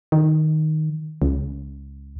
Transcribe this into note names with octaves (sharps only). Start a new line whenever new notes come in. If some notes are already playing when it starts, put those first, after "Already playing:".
D#3
C#2